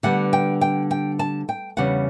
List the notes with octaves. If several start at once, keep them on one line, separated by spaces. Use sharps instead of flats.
D3 G3 B3 F#5
G5
G5
G5
A5
G5
E2 C#3 G3 D4 F#5